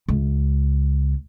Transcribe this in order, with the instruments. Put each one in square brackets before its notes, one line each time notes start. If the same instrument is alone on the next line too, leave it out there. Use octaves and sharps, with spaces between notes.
[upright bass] C#2